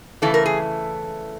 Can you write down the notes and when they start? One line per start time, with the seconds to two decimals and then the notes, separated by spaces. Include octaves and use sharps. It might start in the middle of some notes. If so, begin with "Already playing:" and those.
0.22 C#3 E3 A3 A4
0.34 A#4
0.46 G#4